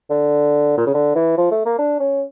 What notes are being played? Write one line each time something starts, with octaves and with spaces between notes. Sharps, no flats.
D3
A#2
C#3
D3
E3
F3
A3
A#3
D4
C#4